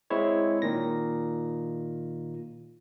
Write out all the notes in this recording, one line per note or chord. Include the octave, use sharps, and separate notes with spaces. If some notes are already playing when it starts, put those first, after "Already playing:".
G#3 C4 E4 C#5
A#2 D#3 A#6